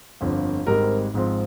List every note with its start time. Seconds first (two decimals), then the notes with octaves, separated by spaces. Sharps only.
0.21 G1 F2 D3 F3
0.67 G#1 G#2 G3 C4 D#4 A#4
1.13 G#1 G#2 F3 C4